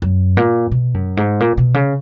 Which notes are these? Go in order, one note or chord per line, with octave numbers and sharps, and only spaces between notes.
F#2
A#2
B2
F#2
G#2
A#2
B2
C#3